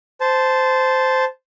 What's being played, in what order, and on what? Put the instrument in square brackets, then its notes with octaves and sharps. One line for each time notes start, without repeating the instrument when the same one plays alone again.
[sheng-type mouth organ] C5 A5